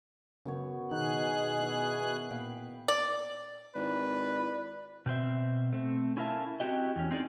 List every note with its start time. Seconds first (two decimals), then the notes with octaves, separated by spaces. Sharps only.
0.46 F#2 C#3 B3 C#5
0.91 B2 D#3 D#4 G#4 F#6
1.60 E4
2.31 A#2 F5 G5 B5
2.88 D5
3.75 G#1 E4 B4 D5
5.06 B2 C4 C5 E5
5.73 A3 C4
6.17 C#4 E4 F4 A#4 E5 A5
6.60 C4 E4 F#4 G4 D#5
6.96 E2 C#4
7.11 C4 D#4 G#4 C5 D5